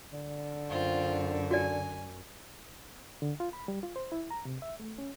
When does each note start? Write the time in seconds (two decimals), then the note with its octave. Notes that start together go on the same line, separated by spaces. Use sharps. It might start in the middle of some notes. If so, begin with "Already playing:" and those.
0.13 D3
0.69 F#2 C4 F4
1.51 F#4 D5 G#5
3.22 D3
3.40 F4
3.53 B5
3.68 G3
3.83 F4
3.96 C5
4.12 E4
4.31 A#5
4.45 C3
4.62 E5
4.80 A3
4.98 C#4